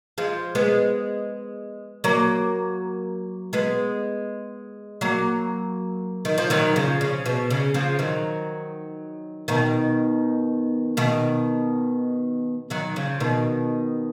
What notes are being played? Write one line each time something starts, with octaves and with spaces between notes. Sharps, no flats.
F3 G#3
G#3 B3
F#3 A#3
G#3 B3
F#3 A#3
D#3
F3
D#3 F#3
C#3 F3
C#3
B2
C#3
C#3 F3
D#3 F#3
B2 D#3
B2 D#3
D#3 F#3
C#3 F3
B2 D#3